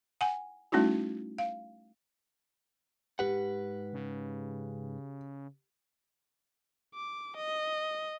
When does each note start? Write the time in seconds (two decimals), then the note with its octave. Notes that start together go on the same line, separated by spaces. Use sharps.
0.21 F#5 G#5
0.72 G3 A3 C#4 D#4 E4 F#4
1.38 F5
3.19 G#2 G4 B4 F#5
3.93 C#3
6.94 D6
7.36 D#5